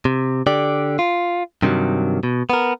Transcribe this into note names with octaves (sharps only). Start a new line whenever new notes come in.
C3
D3 G4 D5
F4
G2 C3 D#3 E3 F#3
B2
B3 A#4